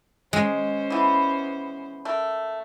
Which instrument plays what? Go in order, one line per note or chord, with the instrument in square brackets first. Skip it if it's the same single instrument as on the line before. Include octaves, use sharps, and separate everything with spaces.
[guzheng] G#3 [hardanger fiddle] C#4 C5
[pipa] E3 B3
A3 A#4